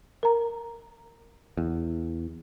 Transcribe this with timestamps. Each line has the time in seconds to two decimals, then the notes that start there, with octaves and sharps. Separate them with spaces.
0.23 A#4 A#5
1.57 E2